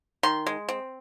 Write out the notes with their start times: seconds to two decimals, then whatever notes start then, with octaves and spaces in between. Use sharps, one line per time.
0.23 D#3 C6
0.46 G#3
0.69 C4